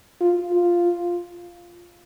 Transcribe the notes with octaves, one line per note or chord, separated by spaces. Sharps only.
F4
F4